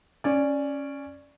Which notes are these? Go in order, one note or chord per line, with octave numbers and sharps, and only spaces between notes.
C#4 D5